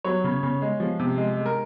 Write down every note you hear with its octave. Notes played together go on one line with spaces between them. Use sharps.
F#3 C#5
C#3
C#3
G#3
F3
C3
G#3
G#3
A#4